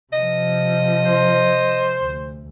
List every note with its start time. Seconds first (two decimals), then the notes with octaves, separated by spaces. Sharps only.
0.13 C3 F3 D#5
1.05 C5
2.01 D2